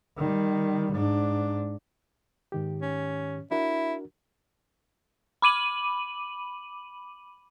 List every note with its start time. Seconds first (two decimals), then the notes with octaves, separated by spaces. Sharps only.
0.18 D#3 G3
0.93 G#2 D4
2.52 G#2 D#3 G4
2.82 C#4
3.51 D4 E4 F#4 A#4
5.42 B5 D6 D#7 F#7